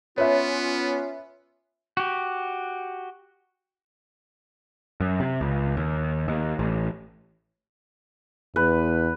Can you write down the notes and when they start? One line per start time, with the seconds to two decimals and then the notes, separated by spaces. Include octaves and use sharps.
0.18 B3 C#4 F4 B4 C#5 E5
1.97 F#4 G4
5.00 F#2
5.20 C3
5.41 C#2
5.77 D#2
6.28 D#2
6.59 A1
8.56 E2 B4